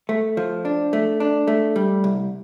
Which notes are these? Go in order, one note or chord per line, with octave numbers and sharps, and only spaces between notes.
A3
F3
D4
A3
D4
A3
G3
C2